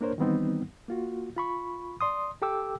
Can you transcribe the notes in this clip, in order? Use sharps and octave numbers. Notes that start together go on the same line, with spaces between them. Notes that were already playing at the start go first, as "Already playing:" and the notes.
A#3 D4 A#4 C5 C#5
D#3 E3 G3 B3 C4 D#4
A#3 F4 F#4
F4 B5 C#6
D5 C6 D#6
G4 A4 G5 D6 E6